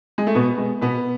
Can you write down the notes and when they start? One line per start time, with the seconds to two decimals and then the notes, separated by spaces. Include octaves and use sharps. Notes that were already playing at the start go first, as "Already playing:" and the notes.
0.18 G#3
0.27 A3
0.35 B2 B3
0.58 G#3
0.82 B2 B3